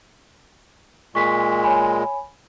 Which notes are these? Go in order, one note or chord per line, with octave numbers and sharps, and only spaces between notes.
A#2 G#3 C#6 B6
C#5 G#5 B5